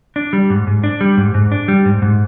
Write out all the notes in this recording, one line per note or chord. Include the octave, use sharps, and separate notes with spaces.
D4
G3
G#2
G#2
D4
G3
G#2
G#2
D4
G3
G#2
G#2